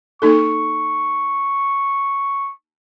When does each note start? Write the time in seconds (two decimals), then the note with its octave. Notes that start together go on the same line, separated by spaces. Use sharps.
0.22 A#3 D#4 A4 C#6